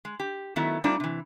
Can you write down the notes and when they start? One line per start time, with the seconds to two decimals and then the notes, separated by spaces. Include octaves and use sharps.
0.05 G#3
0.20 G4
0.56 D#3 F#3 A3 B3 E4
0.84 G3 A3 C4 D4 D#4 F4
1.00 C3 E3